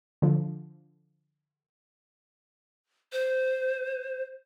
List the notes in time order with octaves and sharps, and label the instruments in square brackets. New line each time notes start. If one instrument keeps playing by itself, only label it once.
[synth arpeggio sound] D3 F3
[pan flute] C5